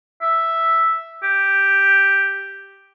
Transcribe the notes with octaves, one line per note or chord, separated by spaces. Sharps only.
E5
G4